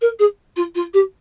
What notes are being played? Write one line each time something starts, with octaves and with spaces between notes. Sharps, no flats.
A#4
G#4
F4
F4
G4